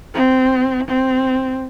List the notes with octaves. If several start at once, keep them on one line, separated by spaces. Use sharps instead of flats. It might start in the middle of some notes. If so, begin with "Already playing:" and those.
C4
C4